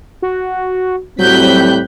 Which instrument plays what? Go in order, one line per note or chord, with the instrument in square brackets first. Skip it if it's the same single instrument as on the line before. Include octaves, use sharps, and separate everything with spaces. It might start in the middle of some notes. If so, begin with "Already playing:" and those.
[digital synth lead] F#4
[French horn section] A2 G3 C4 [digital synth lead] F#3 [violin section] F#6 G6 B6